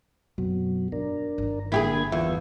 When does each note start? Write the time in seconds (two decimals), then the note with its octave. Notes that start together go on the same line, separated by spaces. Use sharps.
0.38 F#2 B2 F#3 C4
0.92 G2 D4 A#4
1.38 G1 D#3
1.72 D3 A#3 E4 G4 G#4 G#6
2.12 E2 G2 F4 E5